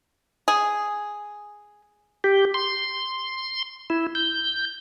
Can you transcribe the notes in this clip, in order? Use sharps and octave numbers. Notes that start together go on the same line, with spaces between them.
G#4
G4
C6
E4
G6